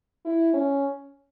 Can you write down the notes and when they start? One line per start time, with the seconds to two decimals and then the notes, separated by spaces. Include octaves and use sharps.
0.25 E4
0.53 C#4